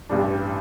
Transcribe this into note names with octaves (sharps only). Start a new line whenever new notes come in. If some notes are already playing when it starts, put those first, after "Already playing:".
A1 G2 G3 D4